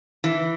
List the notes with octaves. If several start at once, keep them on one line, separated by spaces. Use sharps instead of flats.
E3